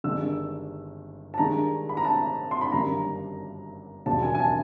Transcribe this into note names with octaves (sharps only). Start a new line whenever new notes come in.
G1 G2 D#3 G#3 E6
A5
G2 D#3 G#3 A#5
B5
A#5
A5
C6
B5
G1 F#2 D#3 G3 A#3 A#5
E1 D#2 C#3 F#3 A5
G#5
G#5
A5